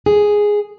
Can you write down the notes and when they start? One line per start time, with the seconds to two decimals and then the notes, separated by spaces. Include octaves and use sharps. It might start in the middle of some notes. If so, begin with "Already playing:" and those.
0.06 G#4